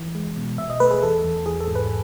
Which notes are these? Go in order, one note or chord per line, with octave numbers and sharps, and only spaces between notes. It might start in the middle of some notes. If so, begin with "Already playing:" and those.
Already playing: E3
G#3
B2
B2 E5
D#5
A3 B4
G#4
E2 A4
E2
E3 G#4
A4
G#2
B4